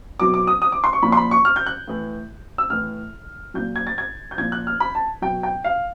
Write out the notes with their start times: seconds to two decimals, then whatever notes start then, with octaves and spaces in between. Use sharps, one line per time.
0.20 B2 F#3 D6
0.34 D6
0.47 D#6
0.62 D#6
0.72 D6
0.84 C6
0.93 C#6
1.03 A#2 F3 B5
1.12 C6
1.17 B5
1.31 C#6
1.45 F6
1.56 G6
1.66 F#6
1.88 A2 E3
2.58 E6
2.70 A2 E3 F6
3.54 A#2 F#3 G6
3.76 G#6
3.87 A6
3.98 G#6
4.31 G6
4.38 A#2 F3 G#6
4.52 F#6
4.67 F6
4.80 B5
4.95 A5
5.22 B2 F#3 G5
5.43 G5
5.64 F5